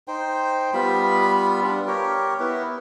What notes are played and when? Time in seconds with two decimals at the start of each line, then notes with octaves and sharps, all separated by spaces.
0.08 D#4 C5 G5
0.73 G3 B3 F4 B5
1.63 G3 B3 D4
1.88 G4 A#4 C#5
2.40 B3 E4 B4